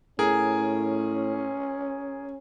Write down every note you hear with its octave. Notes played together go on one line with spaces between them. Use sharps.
A2 C#4 G#4 A#4